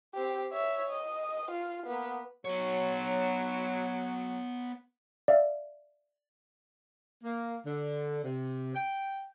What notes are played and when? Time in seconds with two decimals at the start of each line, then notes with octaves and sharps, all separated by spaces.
0.14 C4 G4
0.52 C#5 E5
0.89 D#5
1.51 F4
1.87 A#3 B3
2.45 F#3 B3 C#5
5.28 D5 E5 F5
7.24 A#3
7.66 D3
8.24 C3
8.75 G5